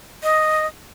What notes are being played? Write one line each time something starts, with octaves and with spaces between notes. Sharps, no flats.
D#5